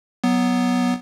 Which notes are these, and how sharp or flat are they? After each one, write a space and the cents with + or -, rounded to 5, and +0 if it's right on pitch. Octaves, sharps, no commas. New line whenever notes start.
F#3 +15 B3 +0